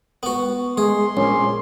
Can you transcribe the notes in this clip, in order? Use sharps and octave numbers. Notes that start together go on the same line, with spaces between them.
B3 F#4
G#3 G#4 C6
A#1 C#4